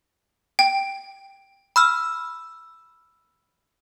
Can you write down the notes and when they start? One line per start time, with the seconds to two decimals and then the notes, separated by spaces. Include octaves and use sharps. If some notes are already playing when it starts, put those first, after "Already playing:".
0.59 G5
1.76 B5 E6 F6